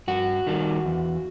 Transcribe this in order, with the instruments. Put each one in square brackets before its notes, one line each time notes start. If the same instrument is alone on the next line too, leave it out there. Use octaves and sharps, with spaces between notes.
[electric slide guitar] G2 F#4
D#3 G3
E2